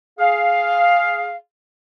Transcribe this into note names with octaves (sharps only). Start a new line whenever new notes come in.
G#4 F5